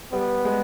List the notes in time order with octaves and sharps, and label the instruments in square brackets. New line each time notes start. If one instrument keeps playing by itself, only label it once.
[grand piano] G3 [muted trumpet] B3
[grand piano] G#3